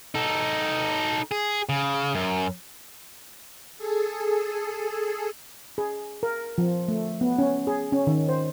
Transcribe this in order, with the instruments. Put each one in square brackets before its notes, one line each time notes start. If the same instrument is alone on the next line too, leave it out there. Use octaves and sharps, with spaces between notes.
[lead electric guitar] D#4 A4
G#4
C#3
F#2
[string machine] G#4 A4
[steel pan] G#4
A#4
F3
A3
B3
C#4
G#4
C#4
D#3
C5